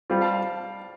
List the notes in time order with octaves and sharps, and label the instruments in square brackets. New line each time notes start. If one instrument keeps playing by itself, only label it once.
[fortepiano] G3 C4 F4 [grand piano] D5 F5
[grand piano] F5 A5
F5 A5